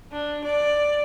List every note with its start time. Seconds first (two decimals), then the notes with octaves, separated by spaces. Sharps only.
0.12 D4
0.44 D5